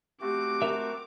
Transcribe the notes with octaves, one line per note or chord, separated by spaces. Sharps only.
A3 C4 F#4 G4 D6
A#4 E5